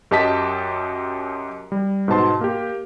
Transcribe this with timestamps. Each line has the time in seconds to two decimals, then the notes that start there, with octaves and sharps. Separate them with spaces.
0.11 F#2 G4 D#5 A5 B6
1.72 G3
2.08 G#2 B2 A5 C6
2.41 A#3 G4